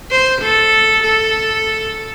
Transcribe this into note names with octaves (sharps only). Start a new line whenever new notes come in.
C5
A4
A4